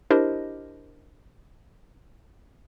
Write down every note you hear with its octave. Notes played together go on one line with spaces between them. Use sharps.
D4 E4 G4 A#4 C5 D#5